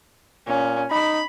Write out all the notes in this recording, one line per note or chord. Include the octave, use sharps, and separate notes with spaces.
A#2 C#4
D#4 B5